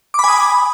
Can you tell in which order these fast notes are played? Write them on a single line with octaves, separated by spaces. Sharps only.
D6 B5 G#5 D#6